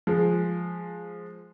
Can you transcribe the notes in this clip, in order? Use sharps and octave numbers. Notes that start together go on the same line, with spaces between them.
F3 G#3